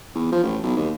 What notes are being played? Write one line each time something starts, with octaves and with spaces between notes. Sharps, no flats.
E2
F3
A1
B1
D#2